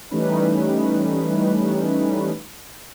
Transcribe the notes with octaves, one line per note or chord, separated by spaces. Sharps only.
E3 G3 A3 C#4 D#4 B4